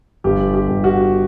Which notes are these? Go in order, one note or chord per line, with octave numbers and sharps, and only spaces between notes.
G1 G4
G4
G1
F#4